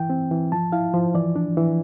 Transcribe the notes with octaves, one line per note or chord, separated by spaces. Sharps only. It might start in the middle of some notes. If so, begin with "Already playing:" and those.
Already playing: E3 G5
C4
E3
F3 A5
E4 F5
F3 C5
E3 D5
D4
E3